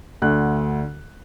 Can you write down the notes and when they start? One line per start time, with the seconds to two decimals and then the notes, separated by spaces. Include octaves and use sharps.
0.22 D2 D3 F#6